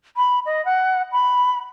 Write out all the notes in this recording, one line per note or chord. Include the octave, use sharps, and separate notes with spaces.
B5
D#5
F#5
B5